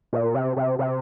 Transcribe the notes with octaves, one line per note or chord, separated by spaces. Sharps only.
A#2
C3
C3
C3